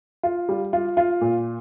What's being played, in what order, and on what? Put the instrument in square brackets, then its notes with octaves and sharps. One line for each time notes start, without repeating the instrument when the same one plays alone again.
[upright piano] F4
G3
F4
F4
A#2